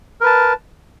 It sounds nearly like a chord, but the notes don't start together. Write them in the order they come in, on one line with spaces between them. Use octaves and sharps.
A#4 B4 A5